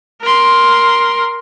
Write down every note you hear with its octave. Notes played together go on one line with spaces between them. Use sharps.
A#4 C6